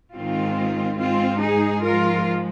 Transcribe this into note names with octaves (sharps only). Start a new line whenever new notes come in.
G#2 D#3 G#3 C4 F4
G#2 G#3 C4 F4
D#4 G#4
G#2 F3 G#3 F4 A#4